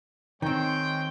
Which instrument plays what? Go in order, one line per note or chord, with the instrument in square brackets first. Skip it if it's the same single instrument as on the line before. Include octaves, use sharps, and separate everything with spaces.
[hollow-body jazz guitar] D#3 C4 [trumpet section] G#3 C#5 G5